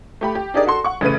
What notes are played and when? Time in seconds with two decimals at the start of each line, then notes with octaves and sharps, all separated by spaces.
0.21 A3 G4 B5
0.35 G4
0.54 D4 D#4 G4 G#4 A#4 D5
0.66 F#4 A4 C6
0.84 F#5 C#6
1.01 A1 C#3 A3 B4 D#7